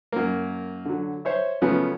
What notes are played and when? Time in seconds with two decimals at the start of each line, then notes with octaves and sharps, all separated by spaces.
0.12 F#2 A#3
0.85 D3 F#3
1.25 C5 C#5 E5
1.62 C#3 F3 F#3 A3 B3 C#4